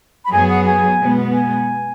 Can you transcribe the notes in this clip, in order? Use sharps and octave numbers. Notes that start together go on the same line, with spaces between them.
B5
F#2 F#3 B3 G#4 G#5
F#5
G#5
B2 G#3 B3
G#5